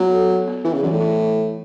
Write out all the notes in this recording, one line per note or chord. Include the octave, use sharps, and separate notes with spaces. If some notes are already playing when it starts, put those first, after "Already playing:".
Already playing: F#3 B3
A4
B3
B3
E3 E4
C#3
F#2 E3
A2
E4